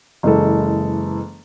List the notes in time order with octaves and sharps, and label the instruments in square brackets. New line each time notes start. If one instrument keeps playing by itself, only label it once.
[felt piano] F#1 E3 G#3 A4